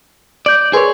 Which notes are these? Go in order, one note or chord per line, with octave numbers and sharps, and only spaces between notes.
D5 G6 F#7
G#4 A#4 B4 C#5 C6